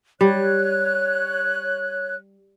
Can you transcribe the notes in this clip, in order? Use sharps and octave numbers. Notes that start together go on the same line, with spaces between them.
G3 C#5 F#6